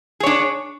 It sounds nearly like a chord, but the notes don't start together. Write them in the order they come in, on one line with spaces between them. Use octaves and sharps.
G#4 C#5 D4